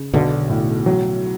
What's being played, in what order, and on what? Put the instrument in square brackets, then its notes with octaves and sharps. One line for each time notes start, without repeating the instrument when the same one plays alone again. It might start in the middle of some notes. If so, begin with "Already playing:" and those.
Already playing: [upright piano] C#3
[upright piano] B1 [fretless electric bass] B2 D3
[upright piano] A2
F#3